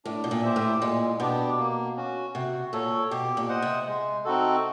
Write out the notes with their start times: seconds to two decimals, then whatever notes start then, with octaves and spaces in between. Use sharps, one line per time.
0.05 A2 D4
0.24 B2
0.31 A#2
0.43 G4 C5 E5
0.56 A2
0.81 A#2 G#3
1.19 B2 B3 D4 G4
1.58 A#3
1.96 C#4 F#4
2.35 C3 F#4
2.73 A#2 A4 C#5
3.10 B2 G4
3.37 A#2
3.49 C5 D#5 F#5
3.62 C3
3.87 G#3
4.25 C4 D#4 F#4 A4